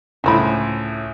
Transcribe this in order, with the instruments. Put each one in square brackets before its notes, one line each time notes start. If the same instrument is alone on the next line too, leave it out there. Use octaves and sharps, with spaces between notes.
[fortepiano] C#2 A2 [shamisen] D3 C4 B5